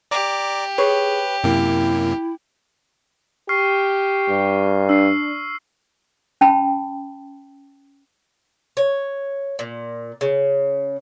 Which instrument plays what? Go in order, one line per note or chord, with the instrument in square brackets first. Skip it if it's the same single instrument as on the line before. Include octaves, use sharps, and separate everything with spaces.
[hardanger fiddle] G4 [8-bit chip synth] D5 A#5 D6
[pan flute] G#4 [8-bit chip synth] B4 [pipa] C#5
[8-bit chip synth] F#2 C3 A#3 [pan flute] E4
[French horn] G4 [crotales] C#6 F6 C7
[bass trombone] G2
[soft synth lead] D4 [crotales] E6 C7
[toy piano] C#4 G5 A5 B5
[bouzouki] C#5
A#2
C#3